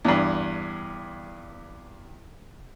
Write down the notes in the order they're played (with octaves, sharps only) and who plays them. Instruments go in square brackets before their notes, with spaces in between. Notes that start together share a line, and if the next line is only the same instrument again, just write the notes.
[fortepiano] E2 G2